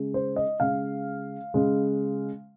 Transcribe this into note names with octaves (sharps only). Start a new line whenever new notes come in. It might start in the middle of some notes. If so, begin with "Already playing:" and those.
Already playing: C#3 G#3
C5
D#5
C#3 G#3 F5
C#3 G#3